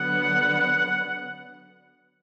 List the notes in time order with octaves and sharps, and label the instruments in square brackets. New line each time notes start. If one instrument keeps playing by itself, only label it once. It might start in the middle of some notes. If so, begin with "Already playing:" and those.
Already playing: [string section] D3 F#3 B3 [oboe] F#5